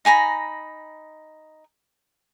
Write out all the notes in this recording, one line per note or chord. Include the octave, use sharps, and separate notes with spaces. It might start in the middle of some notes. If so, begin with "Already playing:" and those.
D#4 G#5 A#5 B5